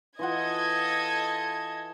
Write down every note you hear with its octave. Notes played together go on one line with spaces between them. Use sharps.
E3 F4 A4 D#5 F#5 G#6